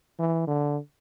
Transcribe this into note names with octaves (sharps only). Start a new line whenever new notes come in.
E3
D3